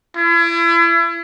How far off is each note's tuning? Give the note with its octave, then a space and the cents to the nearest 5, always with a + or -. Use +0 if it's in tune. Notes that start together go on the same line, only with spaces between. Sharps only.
E4 +40